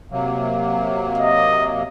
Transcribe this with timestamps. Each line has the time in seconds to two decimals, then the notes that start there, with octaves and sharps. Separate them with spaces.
0.11 C3 F#3 A#3
1.18 D#5